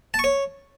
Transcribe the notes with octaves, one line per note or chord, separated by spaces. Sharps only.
A5
C#6
C#5